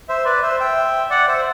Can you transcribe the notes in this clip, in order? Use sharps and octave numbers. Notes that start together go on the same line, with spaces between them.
C5 E5
B4 D5
C5 E5
E5 G5
D5 F#5
C5 E5